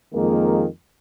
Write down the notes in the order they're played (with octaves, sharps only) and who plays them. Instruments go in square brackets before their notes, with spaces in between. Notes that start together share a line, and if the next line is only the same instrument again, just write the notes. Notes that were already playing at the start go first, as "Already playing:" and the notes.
[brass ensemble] F2 D#3 G#3 A#3